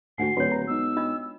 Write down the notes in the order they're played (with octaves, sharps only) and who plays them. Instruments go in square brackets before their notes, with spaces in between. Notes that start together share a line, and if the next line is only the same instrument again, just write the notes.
[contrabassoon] D2 [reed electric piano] G#2 F#4 [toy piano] D4 F#5 G#5 [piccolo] C7
[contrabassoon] D1 [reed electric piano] D3 D4 B4 [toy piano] F#4 C#5
[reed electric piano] B4 A#5
[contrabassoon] B2 [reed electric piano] G#3 D#4 [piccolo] E6
[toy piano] D4 F4 D#5